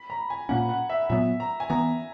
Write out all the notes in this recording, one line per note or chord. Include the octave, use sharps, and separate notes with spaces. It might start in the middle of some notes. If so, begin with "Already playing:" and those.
Already playing: B5
A#5
G#5
A#2 A#3 C#4 F#5
F#5
E5
A#2 F#3 B3 E5
A#5
G#5
E3 B3 A#5